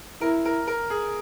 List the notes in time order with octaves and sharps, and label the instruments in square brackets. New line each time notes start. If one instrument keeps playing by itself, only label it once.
[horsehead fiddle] E4 [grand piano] A#4
[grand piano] A#4
A#4
G#4